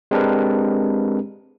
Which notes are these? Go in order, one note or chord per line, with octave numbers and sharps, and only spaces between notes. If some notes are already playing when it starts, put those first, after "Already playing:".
G#3 C4 D4 G4 A#4 B4